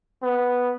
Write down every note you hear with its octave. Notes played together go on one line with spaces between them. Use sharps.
B3